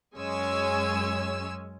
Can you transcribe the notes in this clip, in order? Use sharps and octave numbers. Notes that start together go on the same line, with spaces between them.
F#2 G#3 C#4 C#5 G#5 E6